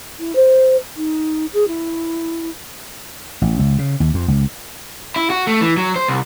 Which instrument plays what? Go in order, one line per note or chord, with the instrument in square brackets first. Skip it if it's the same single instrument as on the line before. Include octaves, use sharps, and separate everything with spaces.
[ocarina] E4
C5
D#4
G#4
E4
[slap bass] A1
C#2
C#3
D#2
F2
C#2
[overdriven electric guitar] E4
F#4
A3
E3
F#3
C5
C2